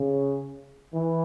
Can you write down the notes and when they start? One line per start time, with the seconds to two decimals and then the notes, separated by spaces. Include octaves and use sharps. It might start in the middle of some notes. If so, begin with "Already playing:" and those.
Already playing: C#3
0.93 E3